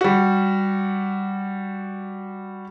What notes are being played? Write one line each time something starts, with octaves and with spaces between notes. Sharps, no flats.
G3 F#4